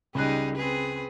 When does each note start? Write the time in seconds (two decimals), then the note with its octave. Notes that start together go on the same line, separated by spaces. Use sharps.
0.15 C#2 G3 D#4 G#4 F#6
0.56 C4 G#4 B4